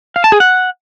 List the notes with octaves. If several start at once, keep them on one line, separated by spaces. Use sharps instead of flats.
F5
A5
G#4
F#5